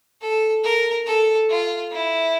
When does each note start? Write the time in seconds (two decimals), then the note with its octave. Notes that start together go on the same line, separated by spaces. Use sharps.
0.21 A4
0.64 A#4
1.06 A4
1.49 F4
1.92 E4